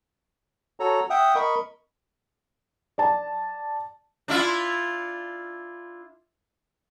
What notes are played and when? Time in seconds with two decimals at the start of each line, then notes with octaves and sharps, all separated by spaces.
0.80 F#4 A4 C#5 A#5
1.10 E5 F#5 G5 D#6
1.35 A#4 D#5 B5 C#6
2.98 D5 A5
4.28 D4 E4 F4